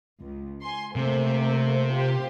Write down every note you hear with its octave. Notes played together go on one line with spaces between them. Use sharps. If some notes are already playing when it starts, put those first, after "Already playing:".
C#2
G#5 C6
C3 A3 A#3 C4
F4 G4 C5